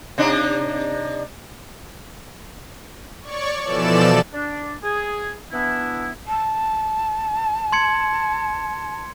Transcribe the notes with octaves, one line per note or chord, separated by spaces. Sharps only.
C3 D4 D#4
C#5 D5 C#6
B2 E3 F3 A4 D5 E7
D4
G#4
E3 B3 D4 E4
A5
C6 G#6 C#7